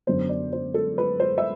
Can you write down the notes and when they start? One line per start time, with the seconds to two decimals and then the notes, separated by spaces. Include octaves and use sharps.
0.07 F#2 D3 F#3 B3 C5
0.29 D5
0.53 C5
0.74 A4
0.98 B4
1.20 C5
1.38 E5